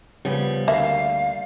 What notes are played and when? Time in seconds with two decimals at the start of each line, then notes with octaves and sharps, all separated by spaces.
0.25 C#3 F3 G3 B3
0.68 D2 A#3 E5 F5